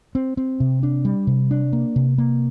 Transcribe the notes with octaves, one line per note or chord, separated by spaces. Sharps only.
C4
C4
C3
D4
G3
C3
D4
A#3
C3
A#3